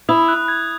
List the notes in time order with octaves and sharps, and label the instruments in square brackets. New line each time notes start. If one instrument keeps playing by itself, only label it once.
[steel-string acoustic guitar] E4 [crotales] D#6
[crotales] F#6
G#6